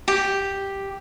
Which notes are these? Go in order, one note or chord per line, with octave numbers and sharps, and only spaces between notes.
G4